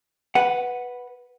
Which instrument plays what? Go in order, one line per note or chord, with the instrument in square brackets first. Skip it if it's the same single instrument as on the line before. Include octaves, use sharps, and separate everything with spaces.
[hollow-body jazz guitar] B4 F#5